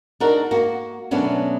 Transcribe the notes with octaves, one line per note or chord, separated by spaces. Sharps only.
D4 D#4 F#4 A#4
A#3 F#4
B2 F#3 A3 B3 C#4 D4